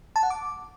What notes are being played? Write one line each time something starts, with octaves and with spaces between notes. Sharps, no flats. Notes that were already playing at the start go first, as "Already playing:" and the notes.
A5
F#5
D6